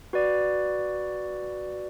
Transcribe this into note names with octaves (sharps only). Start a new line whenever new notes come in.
F#4 B4 D5